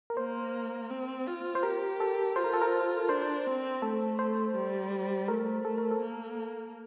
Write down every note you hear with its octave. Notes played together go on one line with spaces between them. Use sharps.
A#4
A#3 C5
C4
F4
C5
G4 A#4
A4
F4 C5
A#4
A4
A#4
D4 C5
C4
A3 A4
C5
G3
A3 A#4
A3 A4
A#4
A4
A#3